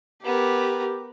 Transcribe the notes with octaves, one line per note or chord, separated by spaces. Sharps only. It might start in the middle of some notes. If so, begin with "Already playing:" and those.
B3 G4 A#4